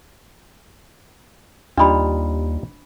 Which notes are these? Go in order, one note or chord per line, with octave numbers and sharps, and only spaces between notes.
D#2 G3 D4 D#4 F4 B5